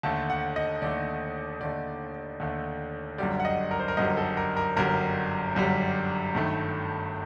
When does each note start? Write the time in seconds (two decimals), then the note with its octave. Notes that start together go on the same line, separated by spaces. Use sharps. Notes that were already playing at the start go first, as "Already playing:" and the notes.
0.03 D#2 D3 A3 A5
0.30 F#5
0.56 D#5
0.82 D#2 D3 A3 D5
1.61 D#2 D3 A3 D5
2.40 D#2 D3 A3
3.18 G1 F#2 D3 G3 D5
3.40 F#5
3.45 D#5
3.71 A#4
3.80 C5
3.88 A#4
3.97 G1 F#2 D3 G3 D#5
4.17 A4
4.37 A#4
4.57 A#4
4.76 G1 F#2 D3 G3 A#4
5.55 G1 F#2 D3 G3
6.34 G1 G2 D#3 A3